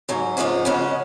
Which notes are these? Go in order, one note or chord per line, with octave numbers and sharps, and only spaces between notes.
G#2 F#3 C#4
G#2 F3 G#3 C#4 F4
C#3 G#3 C#4 F#4